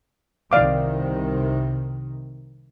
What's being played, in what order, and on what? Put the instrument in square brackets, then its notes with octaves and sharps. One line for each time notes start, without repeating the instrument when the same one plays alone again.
[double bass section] C2 C3 D#3 [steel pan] D5 F5 D6